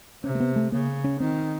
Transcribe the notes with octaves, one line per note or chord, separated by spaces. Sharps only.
C3 C#4
A#3
B3
A3
C#3 A#3
C#4
D#3 C4